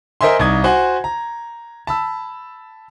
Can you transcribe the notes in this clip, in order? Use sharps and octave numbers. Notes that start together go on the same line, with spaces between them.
A#4 C5 D#5 E5 G#5 C6
C2 D#4 D#6 G#6
F#4 C5 F#5 G#5
A#5
A5 B5 E6